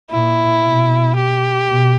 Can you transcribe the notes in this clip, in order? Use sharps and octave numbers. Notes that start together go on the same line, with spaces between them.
A#2 E4
B2
G4
B2